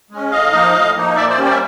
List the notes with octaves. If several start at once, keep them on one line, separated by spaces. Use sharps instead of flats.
G#3 C#4
A2 D#5 F5
F3 A#3 D#4
A2
F3 A#3 D#4
A#2 D5 E5
C5 D5
G3 A#3 C#4
C5 D5
E5